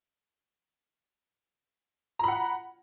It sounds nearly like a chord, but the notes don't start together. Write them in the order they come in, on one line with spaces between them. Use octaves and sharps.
A#5 B5 F#5